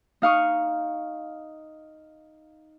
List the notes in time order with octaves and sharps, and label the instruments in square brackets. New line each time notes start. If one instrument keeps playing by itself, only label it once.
[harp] D#4 F5 C#6 D#6